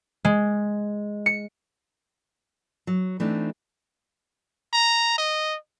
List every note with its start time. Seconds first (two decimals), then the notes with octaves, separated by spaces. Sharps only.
0.25 G#3
1.26 C#7
2.87 F#3
3.20 E3 A3 C4 D4 D#4
4.73 A#5
5.18 D#5